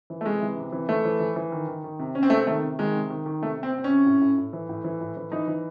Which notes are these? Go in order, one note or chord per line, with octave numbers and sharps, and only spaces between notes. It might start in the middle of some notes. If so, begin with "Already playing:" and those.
E3
A3
C3 G#3
E3
C3
E3
E3 A3
E3
E3
E3
D#3
D#3
D#3
C3
C3 C#4
C4
C3 A3
C4
D#3 A3
C3
D#3 G#3
C3
D#3
D#3
C3 A3
C3 C4
C3 C4
C#4
C3
A2
A2
A2
E3
A2
E3
A2
E3
E3 D#4
E3